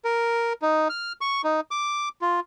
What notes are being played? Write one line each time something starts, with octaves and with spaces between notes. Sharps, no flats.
A#4
D#4
F6
C#6
D#4
D6
F4